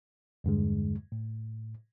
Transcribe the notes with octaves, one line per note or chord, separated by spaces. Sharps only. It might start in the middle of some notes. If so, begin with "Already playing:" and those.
E2 G2 D3 G#3
A2